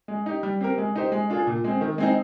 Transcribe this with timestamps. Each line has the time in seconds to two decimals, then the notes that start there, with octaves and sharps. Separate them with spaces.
0.08 G#3
0.26 D#4 G4
0.43 G3
0.61 C4 G4 A#4
0.78 G#3
0.96 D#4 G4 C5
1.12 G#3
1.30 D4 F4 G#4
1.47 A#2
1.64 G#3 C4
1.81 D#3
1.98 G#3 C4 D#4